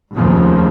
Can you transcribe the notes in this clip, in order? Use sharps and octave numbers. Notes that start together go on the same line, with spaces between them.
F1 D#2 C#3 F3